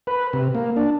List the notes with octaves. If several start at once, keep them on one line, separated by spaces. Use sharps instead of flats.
B4
C3
A#3
D4